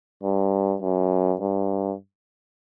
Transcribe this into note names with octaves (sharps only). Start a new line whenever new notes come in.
G2
F#2
G2